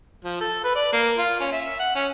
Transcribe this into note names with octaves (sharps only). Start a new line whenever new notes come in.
F3
A4
B4
D5
A#3
F4
C#4
E5
F#5
C#4